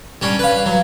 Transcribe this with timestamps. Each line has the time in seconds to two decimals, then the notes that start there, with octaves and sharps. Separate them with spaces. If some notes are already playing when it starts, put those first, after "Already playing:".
0.22 G3 C#4 D4
0.39 B4 F5
0.66 F#3